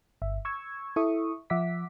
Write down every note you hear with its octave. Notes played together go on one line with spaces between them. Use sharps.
G1 E5
C#6 E6 G#6
E4 A4 E5 C#6 D#6
F3 E5 F#5 D6 B6